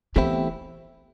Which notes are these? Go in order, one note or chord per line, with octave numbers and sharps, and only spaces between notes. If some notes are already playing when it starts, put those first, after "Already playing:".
E3 A3 B3 C4 E4 G4